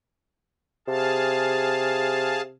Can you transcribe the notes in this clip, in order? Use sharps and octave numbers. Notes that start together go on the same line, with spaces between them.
C3 G#4 F5 A5